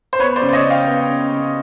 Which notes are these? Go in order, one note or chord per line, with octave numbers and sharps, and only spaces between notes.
C5
B3 B4 C#5
C5 D5
C#3
D5
C#5 D#5
C#3
F5 G5
B3
C#3
C#3